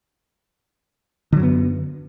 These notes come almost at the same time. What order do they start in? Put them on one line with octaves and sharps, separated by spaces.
D3 F#3 F#2 B3